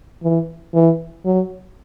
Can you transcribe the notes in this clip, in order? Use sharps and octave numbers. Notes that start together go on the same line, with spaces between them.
E3
E3
F#3